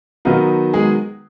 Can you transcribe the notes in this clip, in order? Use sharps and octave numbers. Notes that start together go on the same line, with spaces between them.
D#3 F#3 B3 D#4 F4
G#3 G#4